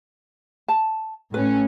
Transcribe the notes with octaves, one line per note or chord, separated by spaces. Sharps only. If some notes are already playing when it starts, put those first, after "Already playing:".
A5
A2 C#4 B4